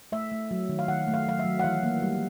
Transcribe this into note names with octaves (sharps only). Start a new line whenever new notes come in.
A3 E5
A3
F#3
D#3
F5
D#3 F#5
A3
F5
F#3 F5
E5
F#3
F#5
E3 F5
A#3
G3